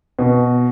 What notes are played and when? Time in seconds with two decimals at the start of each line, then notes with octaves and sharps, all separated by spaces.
0.19 B2